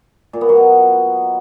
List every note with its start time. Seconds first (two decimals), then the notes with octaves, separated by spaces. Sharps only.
0.33 A#2
0.41 B3
0.49 F#3
0.57 B2